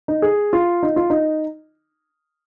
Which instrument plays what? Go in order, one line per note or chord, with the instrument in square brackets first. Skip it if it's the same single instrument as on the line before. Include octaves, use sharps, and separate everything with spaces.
[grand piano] D#4
G#4
F4
D#4
F4
D#4